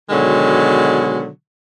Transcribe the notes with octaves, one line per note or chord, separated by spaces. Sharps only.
B2 D3 D#3 F#3 G#3